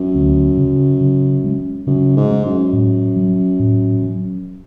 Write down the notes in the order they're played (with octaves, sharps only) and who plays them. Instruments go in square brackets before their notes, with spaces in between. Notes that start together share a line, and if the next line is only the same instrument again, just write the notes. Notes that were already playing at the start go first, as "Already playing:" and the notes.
Already playing: [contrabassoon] F#2
[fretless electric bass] D2
C#3 F#3
C#3
G#3 C#4
[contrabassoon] F#2 [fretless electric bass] C#3
[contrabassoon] G#2
[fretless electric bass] G#3 C#4
[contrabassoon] F#2
[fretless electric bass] A2
F#3 C#4
A2
F#3 C#4